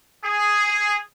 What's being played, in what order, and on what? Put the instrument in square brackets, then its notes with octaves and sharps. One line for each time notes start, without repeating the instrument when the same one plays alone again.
[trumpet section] G#4